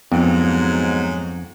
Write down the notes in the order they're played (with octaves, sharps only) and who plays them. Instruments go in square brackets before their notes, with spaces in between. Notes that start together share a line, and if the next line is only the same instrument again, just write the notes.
[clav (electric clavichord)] F2 [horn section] G#2 F#3 [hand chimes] B3